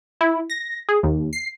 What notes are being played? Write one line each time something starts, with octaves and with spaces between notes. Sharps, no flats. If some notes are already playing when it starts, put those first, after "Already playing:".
E4
A#6
G#4
D#2
C7